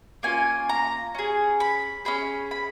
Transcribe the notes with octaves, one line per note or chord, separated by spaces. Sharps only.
A#3 C#4 F4 G#5
A#5
C#4 G#4
B5
C#4 G#4 B5
B5